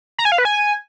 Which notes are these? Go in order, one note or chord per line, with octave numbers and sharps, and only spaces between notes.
A#5
G#5
F5
B4
G#5